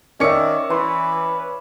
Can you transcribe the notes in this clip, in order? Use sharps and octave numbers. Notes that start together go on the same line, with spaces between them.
D#3 C#4 D5 E5 C#6 C#7
E3 B4 C6